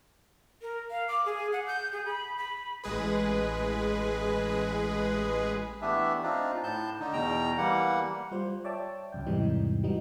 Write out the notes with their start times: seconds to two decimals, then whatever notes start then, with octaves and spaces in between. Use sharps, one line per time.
0.62 A#4
0.91 F5
1.08 D6
1.26 G#4
1.53 F#5
1.67 G6
1.92 G#4
2.06 B5
2.38 B5
2.84 A1 G#3 G#4 B4
5.82 E3 A3 B3 D4 G4 E5
6.23 C4 D4 D#4 F4
6.63 A2 A5 G6
7.00 D3 D#4
7.13 E2 B2 G5 A#5
7.58 E3 G3 A#3 F#5
8.31 G3 F4 C5
8.64 C#5 D5 E5 G5 A5 D6
9.12 C#2 F#2 G5
9.26 E2 G#2 C3 E3 G3 D#4
9.83 E3 F#3 G3 D#4